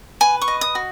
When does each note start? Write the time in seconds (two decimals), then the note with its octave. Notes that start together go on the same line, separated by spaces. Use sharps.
0.21 B4 G#5
0.42 C#6
0.48 D#5
0.61 D#6
0.75 F#4